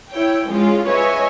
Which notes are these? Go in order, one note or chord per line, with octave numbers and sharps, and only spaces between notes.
E4 C#5 G5
F3 G#3 C#4 F4
B4 C#5 D#5 E5 G#5